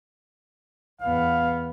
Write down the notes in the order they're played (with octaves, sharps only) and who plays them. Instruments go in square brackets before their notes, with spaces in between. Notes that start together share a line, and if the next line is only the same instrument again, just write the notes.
[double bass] E2 B3 [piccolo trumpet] F5